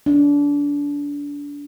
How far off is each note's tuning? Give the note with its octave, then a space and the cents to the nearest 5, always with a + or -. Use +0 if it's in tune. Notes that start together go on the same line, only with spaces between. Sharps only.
D4 -30